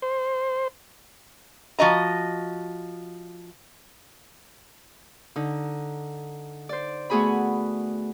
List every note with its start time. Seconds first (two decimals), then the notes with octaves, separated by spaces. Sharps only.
0.02 C5
1.79 F3 F#4 D#5 A#5
5.36 D3 D#4
6.69 C5 D5
7.10 A3 B3 F#4 G#4 G#5 B5